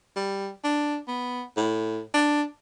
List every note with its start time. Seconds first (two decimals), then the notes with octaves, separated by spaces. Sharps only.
0.16 G3
0.64 D4
1.08 B3
1.57 A2
2.14 D4